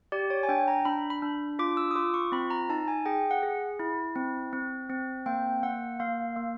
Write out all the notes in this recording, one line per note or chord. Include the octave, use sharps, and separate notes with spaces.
G4 D5
C#5
G#5
D4 G5
A#5
D4 B5
B5
D4
F4 D6
E6
D#6
F4 D6
C#6
C4 B5
A#5
D#4 A5
G#5
G#4 G5
F#5
G#4
E4
C4
C4
C4
A#3 G5
A#3 F#5
A#3 F5
A#3